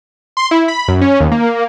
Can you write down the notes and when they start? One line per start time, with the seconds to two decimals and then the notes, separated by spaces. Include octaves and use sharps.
0.37 C6
0.51 E4
0.68 B5
0.88 F#2
1.01 C#4
1.20 D#2
1.31 A#3